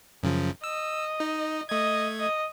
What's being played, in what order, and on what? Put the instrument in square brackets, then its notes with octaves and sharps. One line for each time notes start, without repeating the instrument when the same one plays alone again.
[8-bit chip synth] F#2 C#3 F3
[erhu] D#5 [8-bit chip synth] E6
[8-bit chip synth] D#4
[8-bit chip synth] A3 G#6 [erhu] D#5
[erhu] D#5